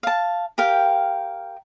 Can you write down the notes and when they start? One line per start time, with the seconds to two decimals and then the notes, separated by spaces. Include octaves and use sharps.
0.03 F5 A5
0.58 G4 A#4 F5 G5